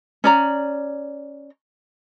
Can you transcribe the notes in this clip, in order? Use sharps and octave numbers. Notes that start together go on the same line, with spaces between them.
C#4 D5 A#5